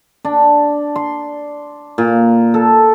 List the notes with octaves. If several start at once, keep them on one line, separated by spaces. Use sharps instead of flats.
D4
C6
A#2
A4